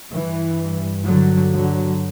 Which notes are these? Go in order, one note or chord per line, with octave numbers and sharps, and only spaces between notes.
G2 E3
D3 F#3
D3 F#3